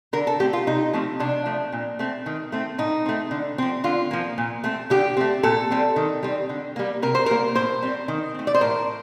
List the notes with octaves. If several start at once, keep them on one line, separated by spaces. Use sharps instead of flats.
D3 A#4
A4
A3 C4 G4
F4
C3 D#4
F3 A3 C4
C3 D4
F3 A3
A#2
A3 C4
D#3
A3 C4
A2 D#4
A3 C4
D3
F3 C4
D3 F4
F3 A#3
A#2
A3 C4
D3 G4
A3 C4
A#2 A4
G3 C4
D#3
G3 C4
D3
G3 A#3
C3 A#4
C5
G3 A#3 A#4
A2 C5
G3 C4
D#3
A3 C4
D5
C5
A2 A#4